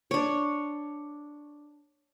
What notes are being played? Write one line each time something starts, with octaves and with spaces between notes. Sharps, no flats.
D4 C#5